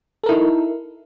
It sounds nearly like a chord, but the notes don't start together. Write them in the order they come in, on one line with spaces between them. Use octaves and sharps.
A4 A#4 E4 D#4